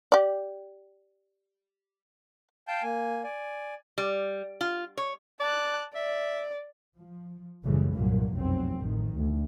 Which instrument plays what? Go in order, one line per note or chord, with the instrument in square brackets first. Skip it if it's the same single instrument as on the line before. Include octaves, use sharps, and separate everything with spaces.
[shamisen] G4 D5
[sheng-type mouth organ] F5 G5 A5 G6
A#3 G#5
D5 G#5
[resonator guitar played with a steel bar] G3
F4
C#5
[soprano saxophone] D5 [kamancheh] A5 F#6
[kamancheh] D5 [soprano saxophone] E5
[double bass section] F3
F#1 A2 C#3 E3 G3 G#3
C2 G2 A#2 F#3 A#3
F1 B1 F#2 F#3 C4
A1 D#3
D2